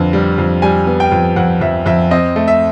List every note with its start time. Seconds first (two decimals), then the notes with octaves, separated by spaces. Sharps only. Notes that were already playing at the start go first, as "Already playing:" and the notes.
Already playing: F2 D3 B3
0.13 G3
0.38 F2
0.62 G3 G#5
0.87 B3
1.00 G5
1.12 F2
1.36 F2 F#5
1.61 F2 E5
1.86 F2 E5
2.11 C4 D#5
2.36 A3
2.48 E5